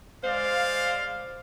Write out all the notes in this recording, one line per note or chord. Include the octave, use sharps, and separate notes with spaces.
G#3 C5 D5 F5